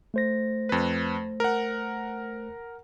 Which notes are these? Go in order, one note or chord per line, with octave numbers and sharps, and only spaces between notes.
A3 C5 A#6
F2 B4
A#4 F#5